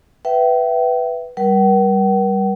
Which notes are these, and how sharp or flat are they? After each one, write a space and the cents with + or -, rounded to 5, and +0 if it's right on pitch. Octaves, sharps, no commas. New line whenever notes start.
B4 +0 E5 +15 G5 -30
G3 +0 A#4 +40 F#5 +45